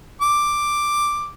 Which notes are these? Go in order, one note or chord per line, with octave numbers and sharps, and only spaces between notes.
D6